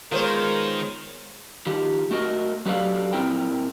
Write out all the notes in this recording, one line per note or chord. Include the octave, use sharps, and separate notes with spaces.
D#3 G#3 B3 F4 A#4 C5 C#5
D#3 F3 G4
A3 F#4 A#4 D#5
F#3 G4 A4 B4 D5 F5
A#2 C4 E4 A#4 G5